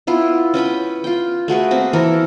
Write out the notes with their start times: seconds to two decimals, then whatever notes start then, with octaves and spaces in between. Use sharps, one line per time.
0.07 B3 E4 F4
0.54 C#4 B4 G5 B5
1.04 F4 G5
1.48 A3 F#4 G#4 B4
1.71 A#3 C4
1.93 E3 E4 A4 A#4